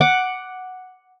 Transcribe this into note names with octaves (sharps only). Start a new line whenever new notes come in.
F#5 D6